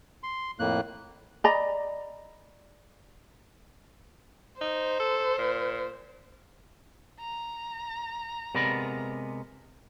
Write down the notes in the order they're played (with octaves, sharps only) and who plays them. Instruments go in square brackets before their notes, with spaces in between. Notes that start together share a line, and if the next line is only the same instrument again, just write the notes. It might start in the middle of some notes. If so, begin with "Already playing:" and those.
[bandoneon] C6
F2 A2 A#3 F#6
[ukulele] D5 D#5 A#5 B5
[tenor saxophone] D#4 [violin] C5
[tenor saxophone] A4
A#2
[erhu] A#5
[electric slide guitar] C3 G#3 B3 [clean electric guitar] A#4 D5 B5